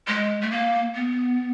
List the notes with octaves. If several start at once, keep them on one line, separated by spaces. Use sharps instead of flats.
G#3
A3
A#3
B3